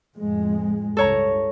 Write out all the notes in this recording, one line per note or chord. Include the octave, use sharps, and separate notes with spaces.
F2 A2 G#3
C#2 G2 A4 C#5 A#5